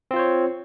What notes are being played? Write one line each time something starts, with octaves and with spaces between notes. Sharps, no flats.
C4 F4 C5 C#5